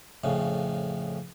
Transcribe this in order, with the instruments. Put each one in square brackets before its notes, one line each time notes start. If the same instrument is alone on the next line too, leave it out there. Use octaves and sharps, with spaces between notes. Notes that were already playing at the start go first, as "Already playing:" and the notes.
[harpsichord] F2 A2 C#3